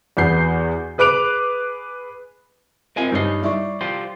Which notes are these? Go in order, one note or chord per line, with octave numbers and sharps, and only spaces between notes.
E2 B3 F#4 G6 C7
G#4 B4 D6 F#6 D7 F7
C4 F4 A#4 D#5 G#5
G2 D#4 C#5 D#5 C7
G3 E4 D5 E5 C#6
F4 G4 C5